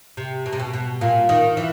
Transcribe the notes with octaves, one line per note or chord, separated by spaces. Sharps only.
C3
B2
C3
B2
B2
A#2 F4
D#3
E3